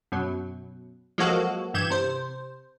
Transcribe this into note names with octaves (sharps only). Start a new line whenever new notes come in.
F#2 B2 F#3
F3 F#3 G#3 A#3 F#4 A4
G2 E3 G6 G#6 E7
C3 C5